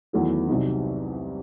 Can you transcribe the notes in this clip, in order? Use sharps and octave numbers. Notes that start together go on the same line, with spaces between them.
E2 D#3 F#3 A3 E4
C2 C3 F#3 C4 D#4